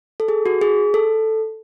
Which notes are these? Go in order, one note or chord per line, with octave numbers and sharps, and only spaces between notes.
A4
G#4
F#4
G#4
A4